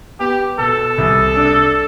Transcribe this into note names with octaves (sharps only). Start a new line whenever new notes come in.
B3 G4
B2 A4
C2
D4